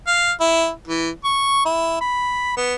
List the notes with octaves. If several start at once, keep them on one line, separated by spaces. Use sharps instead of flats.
F5
E4
E3
C#6
E4
B5
B3